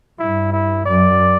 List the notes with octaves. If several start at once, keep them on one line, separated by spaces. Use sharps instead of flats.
G2 E4
E4
F#2 D5